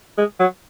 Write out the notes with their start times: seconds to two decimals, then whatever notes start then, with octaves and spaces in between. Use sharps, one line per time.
0.18 G#3
0.40 F#3